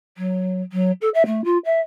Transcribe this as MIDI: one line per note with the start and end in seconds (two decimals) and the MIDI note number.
0.17 0.61 54
0.72 0.92 54
1.01 1.09 69
1.14 1.23 76
1.26 1.43 57
1.44 1.58 65
1.65 1.80 76